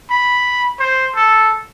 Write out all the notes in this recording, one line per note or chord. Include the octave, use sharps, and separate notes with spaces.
B5
C5
A4